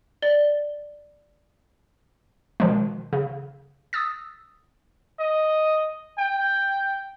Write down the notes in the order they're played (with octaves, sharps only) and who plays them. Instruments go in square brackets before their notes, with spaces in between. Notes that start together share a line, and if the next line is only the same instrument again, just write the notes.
[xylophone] D5 G7
[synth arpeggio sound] B2 D#3 F3 G#3
C#3
D#6 E6 A6
[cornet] D#5
G5